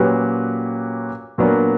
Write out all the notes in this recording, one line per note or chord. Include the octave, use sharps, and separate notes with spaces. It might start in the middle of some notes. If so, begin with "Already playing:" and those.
Already playing: A#2 F#3 C#4 G4 B4
A#2 F#3 B3 D4 A#4